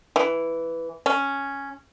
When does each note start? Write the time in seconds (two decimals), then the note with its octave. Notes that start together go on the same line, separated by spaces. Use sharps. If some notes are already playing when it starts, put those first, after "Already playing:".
0.16 E3
1.06 C#4